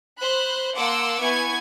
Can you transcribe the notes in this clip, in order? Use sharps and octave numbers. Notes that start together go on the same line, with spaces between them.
C5 B5 F#6
A#3 F#5 A5 C6 D6 E6
B3 E4 G#5 C#6 G#6